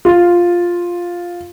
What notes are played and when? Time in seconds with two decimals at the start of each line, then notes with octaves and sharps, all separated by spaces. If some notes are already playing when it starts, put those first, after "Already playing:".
0.05 F4